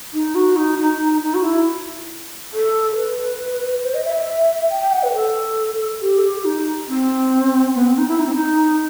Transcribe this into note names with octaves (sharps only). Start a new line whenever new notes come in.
D#4
F#4
D#4
D#4
D#4
F#4
E4
A4
B4
C5
D#5
E5
E5
G5
G5
F#5
B4
A4
G4
A4
G4
D#4
C4
B3
C4
D#4
E4
D#4
C4
D#4